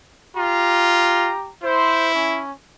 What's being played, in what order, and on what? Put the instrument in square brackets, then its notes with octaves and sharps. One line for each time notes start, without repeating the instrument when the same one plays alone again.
[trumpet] F4 [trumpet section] G4 A#5
[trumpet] E4 [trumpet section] C5
[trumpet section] C#4